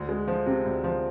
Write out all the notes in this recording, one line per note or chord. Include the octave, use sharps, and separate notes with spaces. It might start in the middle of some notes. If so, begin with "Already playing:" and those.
Already playing: D2
G#3
F3
C3
D2
F3